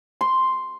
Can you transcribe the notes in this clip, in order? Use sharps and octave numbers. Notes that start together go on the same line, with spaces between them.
C6